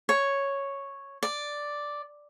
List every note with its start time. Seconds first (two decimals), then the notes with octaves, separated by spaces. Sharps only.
0.09 C#5
1.23 D5